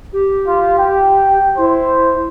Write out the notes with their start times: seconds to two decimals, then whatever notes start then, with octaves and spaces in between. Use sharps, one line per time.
0.13 G4
0.47 F4
0.78 G5
1.58 E4 C5